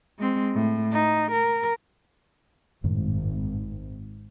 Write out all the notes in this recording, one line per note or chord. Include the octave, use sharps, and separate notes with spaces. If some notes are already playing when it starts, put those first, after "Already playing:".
G#3 C4
A2
D#4
A#4
G#1 F#2 A2 D#3